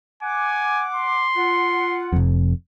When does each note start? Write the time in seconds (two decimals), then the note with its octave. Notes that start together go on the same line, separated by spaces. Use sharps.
0.23 F#5 G#5 D6
0.93 C6
1.36 F4 F#5
2.13 F1 F2